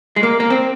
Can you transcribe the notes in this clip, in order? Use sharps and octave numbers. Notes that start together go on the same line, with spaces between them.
G#3
A#3
A#3
C4